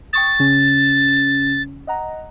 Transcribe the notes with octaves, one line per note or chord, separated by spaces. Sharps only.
G5 C#6 D#6 A6
C#3 C#4
D#5 F#5 A#5